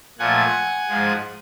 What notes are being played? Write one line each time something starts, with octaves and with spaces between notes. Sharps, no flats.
A#2 F3 A3 F#5 G#5
G#2 F3 G#3